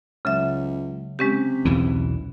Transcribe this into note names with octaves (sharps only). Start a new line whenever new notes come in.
C#2 C#3 F#3 E5
C3 G#3 C#4 G4
B1 E2 E3